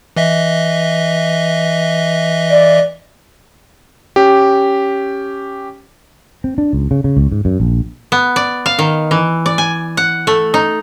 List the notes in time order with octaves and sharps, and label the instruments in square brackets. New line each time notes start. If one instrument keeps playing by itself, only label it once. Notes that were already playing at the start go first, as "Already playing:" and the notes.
[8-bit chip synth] E3 D#5 E5
[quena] D5
[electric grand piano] C#4 G4
[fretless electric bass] C4
D4
C#2
C#3
C#3
C#2
G#2
F#2
A#1
[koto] B3
D5
F5
D#3
E3
D5
G#5
F#5
A3
D#4